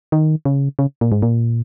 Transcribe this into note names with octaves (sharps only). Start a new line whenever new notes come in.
D#3
C#3
C#3
A#2
G#2
A#2